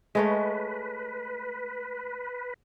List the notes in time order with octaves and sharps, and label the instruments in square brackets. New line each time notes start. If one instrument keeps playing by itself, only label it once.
[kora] G#3 A3 C#5 [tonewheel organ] B4